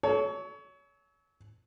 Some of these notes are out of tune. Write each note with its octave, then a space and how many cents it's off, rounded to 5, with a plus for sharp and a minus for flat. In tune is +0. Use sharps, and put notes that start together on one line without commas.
A4 -30 C#5 +25